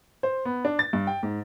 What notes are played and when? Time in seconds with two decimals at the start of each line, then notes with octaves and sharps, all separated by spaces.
0.23 C5
0.45 B3
0.65 D4
0.79 A6
0.93 G2
1.07 G5
1.23 G#2